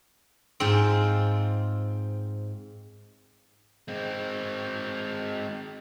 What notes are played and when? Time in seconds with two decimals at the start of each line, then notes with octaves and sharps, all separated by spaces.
0.60 G#2 C4 F4
3.88 G#3 C4